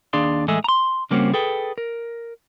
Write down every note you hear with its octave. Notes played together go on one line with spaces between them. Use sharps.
D#2 D4 G#4 D5 F5 C6
A2 E3 G#3 G#4 A4 E5
A#5 C6
C#3 G3 A#3 C4 C#4 F#4
G#4 A4 B4 G5
A#4